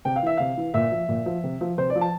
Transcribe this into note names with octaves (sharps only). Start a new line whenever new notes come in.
C3 G5
F5
E3 E5
C3 F5
E3
A#2 E5
F3
A#2
F3
C3
F3
C3 C5
D5
F3
A5